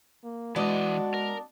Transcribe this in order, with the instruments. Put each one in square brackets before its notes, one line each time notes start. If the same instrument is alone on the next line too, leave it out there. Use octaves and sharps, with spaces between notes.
[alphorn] A#3
[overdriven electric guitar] E3 D#5 [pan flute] G#3 [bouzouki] B3 D4 D5 [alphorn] F#4
[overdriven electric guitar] A#4